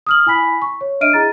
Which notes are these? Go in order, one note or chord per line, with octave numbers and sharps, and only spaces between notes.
D#6 F6 F#7
E4 G#5 B5 B6
C#6
C#5
D4 D#5 E5 F6 D7 D#7
E4 G#4 A#5 A6